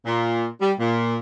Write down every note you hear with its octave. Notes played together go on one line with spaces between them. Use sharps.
A#2
G3
A#2